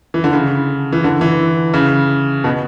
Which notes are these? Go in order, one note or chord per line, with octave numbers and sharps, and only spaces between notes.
E3
D3
C#3
E3
D3
E3
C#3
B2